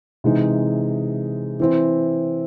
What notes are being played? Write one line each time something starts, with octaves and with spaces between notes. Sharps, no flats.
C3 E3 G#3 D#4
E3 C4 E4